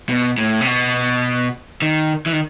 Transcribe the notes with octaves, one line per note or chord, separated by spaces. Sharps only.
B2
A2
C3
B2
D#3
E3
D#3